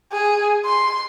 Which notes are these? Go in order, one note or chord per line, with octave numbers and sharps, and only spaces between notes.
G#4
C6